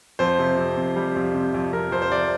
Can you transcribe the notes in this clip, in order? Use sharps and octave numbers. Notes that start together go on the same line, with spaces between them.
F2 C5
C3
F2
F2
G3
F2
C3
F2
F2 A#4
F2 C5
C5
C3 D5